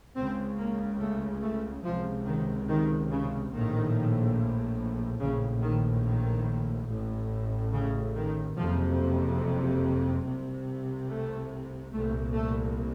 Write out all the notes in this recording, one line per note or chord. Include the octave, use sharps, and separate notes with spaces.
C#2 C#3 C4
A#3
A3
A3
C#2 C3 F3
D#3
D#3
C#3
A#1 A2 D#3
A#1 A2 C#3
D#3
D#3
A1 A2
C#3
D#3
F#1 F2 C3 F3
C2 C3
A3
C2 A#2 A3
A3